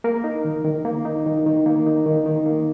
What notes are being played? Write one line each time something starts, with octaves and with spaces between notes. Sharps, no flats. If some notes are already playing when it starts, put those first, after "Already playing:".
A#3 A#4
D#4
D#3
D#3
A#3
D#4
D#3
D#3
A#3
D#4
D#3
D#3
A#3